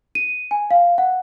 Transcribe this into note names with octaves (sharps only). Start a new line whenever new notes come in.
D#7
G#5
F5
F#5